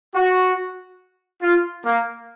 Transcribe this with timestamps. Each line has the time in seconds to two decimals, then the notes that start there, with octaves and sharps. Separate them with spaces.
0.15 F#4
1.42 F4
1.86 A#3